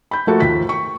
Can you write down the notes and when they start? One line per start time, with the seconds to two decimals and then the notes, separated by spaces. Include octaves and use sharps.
0.11 B5 G6
0.27 F3 A3 A#3 F4 F#4 A4
0.40 D#2 F3 B6
0.69 C#6